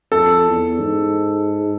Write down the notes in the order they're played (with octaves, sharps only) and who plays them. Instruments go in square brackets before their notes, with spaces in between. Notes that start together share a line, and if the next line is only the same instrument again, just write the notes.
[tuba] F2 [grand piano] A4
[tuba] E2
G#2